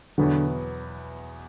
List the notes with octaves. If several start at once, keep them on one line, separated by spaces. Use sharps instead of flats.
E2 B2 D3 F#3 B3 F#4